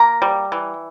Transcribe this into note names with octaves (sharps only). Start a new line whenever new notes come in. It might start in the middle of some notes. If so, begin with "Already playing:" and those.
Already playing: A#3 A#5
G3
E3